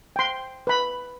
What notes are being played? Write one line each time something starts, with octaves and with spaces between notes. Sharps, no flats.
G5 C6
B4 B5